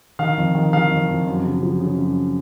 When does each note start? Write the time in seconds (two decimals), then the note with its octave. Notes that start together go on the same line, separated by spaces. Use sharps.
0.19 D#3 F5
0.38 F2
0.55 D#3
0.73 D#3 F5
0.91 F2
1.09 F2
1.27 F#2
1.45 C#3
1.63 F3
1.81 C#3
1.98 F#2